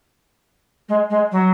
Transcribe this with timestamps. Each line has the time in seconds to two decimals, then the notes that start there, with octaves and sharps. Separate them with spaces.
0.88 G#3
1.10 G#3
1.31 F#3